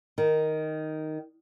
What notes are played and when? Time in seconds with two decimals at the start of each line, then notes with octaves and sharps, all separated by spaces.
0.18 D#3